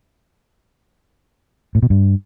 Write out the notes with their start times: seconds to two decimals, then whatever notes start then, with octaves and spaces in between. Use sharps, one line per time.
1.75 A2
1.83 B2
1.90 G2